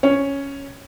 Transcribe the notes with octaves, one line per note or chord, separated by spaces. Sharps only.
C#4 C#5